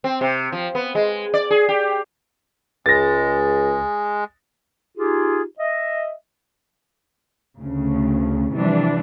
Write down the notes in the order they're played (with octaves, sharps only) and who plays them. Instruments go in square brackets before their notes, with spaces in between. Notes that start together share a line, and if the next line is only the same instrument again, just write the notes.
[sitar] C4
C3
F3
B3
G#3
D5
G#4
G4
[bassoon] C#2 [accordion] G#3 [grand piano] A6 A#6
[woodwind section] D#4 F4 G4 G#4
D#5 E5
[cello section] D2 C#3
C3 E3 F3 G3 D4